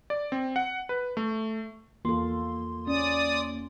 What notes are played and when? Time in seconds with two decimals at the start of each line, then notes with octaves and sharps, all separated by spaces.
0.10 D5
0.32 C4
0.56 F#5
0.89 B4
1.17 A3
2.05 E2 A#3 F4 A4 C6
2.87 C#4 D5 D#6